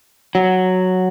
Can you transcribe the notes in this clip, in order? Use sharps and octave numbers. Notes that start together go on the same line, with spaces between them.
F#3